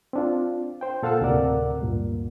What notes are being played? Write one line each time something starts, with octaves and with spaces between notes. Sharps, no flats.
C4 D4 F4
C5 G5
A#2 A4 F5 F#5 A5 E6
D2 A2 C3 A#4 D5 F#5
D2 G2 A#2